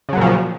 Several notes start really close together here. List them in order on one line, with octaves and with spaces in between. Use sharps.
C#3 F#3 A#2 F3